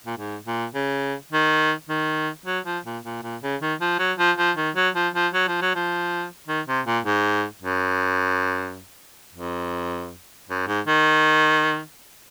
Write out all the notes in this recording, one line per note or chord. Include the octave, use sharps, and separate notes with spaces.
A#2
G#2
A#2
C#3
D#3
D#3
F#3
F3
A#2
A#2
A#2
C#3
D#3
F3
F#3
F3
F3
D#3
F#3
F3
F3
F#3
F3
F#3
F3
D#3
C3
A#2
G#2
F#2
F2
F#2
G#2
D#3